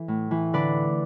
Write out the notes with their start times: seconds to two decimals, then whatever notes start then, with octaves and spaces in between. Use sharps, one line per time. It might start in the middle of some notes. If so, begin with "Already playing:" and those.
Already playing: E3 A4
0.08 A2
0.31 E3
0.53 D3 B4 D5